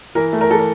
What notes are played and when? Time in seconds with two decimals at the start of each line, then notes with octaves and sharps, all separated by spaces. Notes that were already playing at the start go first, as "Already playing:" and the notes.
0.15 E3 A#4
0.33 A3
0.41 A#4
0.50 E3 A4
0.59 A#4